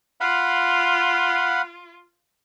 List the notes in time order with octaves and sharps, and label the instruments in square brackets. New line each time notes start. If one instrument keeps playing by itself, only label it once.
[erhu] F4 [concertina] F5 F#5 B5